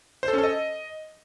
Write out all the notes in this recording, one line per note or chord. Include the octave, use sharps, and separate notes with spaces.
C5
A4
C#4
A4
D#5